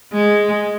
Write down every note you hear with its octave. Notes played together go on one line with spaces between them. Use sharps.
G#3